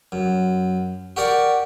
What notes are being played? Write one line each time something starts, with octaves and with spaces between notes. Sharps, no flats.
F#2
F#4 G4 A#4 D5 F#5